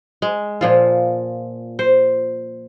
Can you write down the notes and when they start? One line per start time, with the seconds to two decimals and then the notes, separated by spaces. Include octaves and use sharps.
0.22 G#3
0.61 A#2 F3 F4
1.79 C5